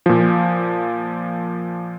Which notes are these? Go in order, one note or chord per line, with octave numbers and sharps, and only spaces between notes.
A#2 F3